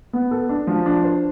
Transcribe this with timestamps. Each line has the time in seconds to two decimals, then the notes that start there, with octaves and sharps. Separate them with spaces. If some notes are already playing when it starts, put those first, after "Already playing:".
0.13 B3
0.31 A4
0.49 D4
0.67 F3
0.86 D4
1.04 C5